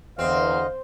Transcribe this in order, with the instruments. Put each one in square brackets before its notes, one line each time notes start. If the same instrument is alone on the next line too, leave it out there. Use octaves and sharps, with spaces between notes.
[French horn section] E2 [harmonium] D3 C5 D#5 [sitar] C4 [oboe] F5